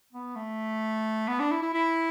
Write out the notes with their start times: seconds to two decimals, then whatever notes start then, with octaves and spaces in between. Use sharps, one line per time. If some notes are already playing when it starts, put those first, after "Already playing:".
0.13 B3
0.36 A3
1.28 B3
1.39 D4
1.51 E4
1.62 E4
1.74 E4